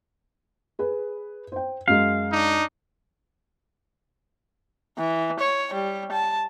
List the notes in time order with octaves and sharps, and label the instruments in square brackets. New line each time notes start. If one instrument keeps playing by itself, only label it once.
[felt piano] G#4 B4
C5 G5
[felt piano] F#2 G#3 [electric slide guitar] F5
[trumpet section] D4 D#4
[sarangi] E3
C#5
G3
A5